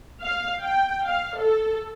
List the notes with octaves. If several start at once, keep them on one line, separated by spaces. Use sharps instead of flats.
F5
G5
F5
A4